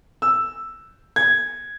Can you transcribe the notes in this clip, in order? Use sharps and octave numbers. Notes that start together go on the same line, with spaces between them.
E6
G#6